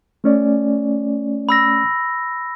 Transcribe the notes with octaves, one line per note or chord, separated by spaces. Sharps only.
A3 C#4 D5
B5 E6 A#6